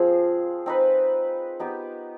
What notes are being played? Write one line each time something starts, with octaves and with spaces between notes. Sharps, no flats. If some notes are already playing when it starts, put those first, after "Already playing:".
Already playing: F3 C4 F4 G#4
C4 D#4 B4
B3 D#4 G4